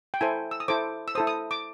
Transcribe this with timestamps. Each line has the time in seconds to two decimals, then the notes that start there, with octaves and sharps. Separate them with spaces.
0.14 G5
0.21 E4 A4 C5 G#5
0.51 E6
0.60 D#6
0.68 E4 A4 C5 D6
1.08 E6
1.15 E4 A4 C5 D#6
1.27 D#6
1.51 D6